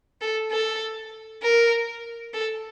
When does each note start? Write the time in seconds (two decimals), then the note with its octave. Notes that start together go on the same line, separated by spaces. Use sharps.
0.21 A4
0.52 A4
1.43 A#4
2.34 A4